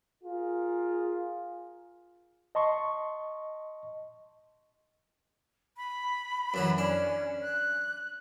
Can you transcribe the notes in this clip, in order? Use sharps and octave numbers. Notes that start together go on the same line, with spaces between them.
F4 G#4 A#4
D#5 A5 C6 C#6
B5
F#2 E3 F#3
C#4 D4
F#6